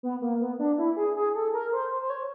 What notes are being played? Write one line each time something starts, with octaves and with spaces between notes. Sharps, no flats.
B3
A#3
B3
D4
E4
G#4
G#4
A4
A#4
C5
C5
C5
C#5